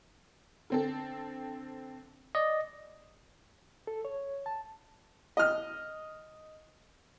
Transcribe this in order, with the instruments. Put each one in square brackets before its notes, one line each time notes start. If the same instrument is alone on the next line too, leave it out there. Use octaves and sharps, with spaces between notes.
[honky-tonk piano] D3 C4 A4
[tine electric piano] D5 D#5
[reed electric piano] A4
C#5
A5
[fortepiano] D#5 F6